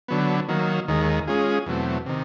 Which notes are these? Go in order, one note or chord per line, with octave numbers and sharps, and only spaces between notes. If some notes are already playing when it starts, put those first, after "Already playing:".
D3 F#3 B3
D#3 F#3 A#3
D#2 D#3 G#3
G#3 C#4 F4 G#4
E2 B2 F#3 A3 C4
C3 D#3